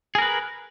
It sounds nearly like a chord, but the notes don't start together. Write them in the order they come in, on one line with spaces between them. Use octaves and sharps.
G#4 A#4 B4